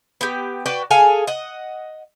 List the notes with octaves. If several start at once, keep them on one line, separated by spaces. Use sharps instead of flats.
B3 G4
F#4 B4 D5 G5
G#4 A4 F5 G#5
D#5 F#5